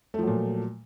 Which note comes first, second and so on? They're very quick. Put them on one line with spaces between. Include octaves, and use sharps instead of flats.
A3 F3 F#3 A#2